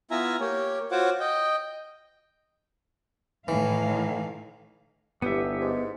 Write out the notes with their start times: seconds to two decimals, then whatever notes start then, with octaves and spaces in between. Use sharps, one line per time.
0.11 B3 E4 F4 E5 G#5 A#5
0.40 A#3 G4 C#5
0.91 F4 F#4 C5 C#5 F#5 D6
1.20 D#5 G5
3.48 A2 D#3 E3 F5
5.22 G1 B3 E4 G4 E5 D6
5.61 G#2